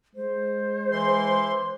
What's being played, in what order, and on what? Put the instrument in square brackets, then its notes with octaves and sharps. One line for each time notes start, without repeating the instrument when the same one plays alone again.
[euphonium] G#3 [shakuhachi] C5
[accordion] E3 C6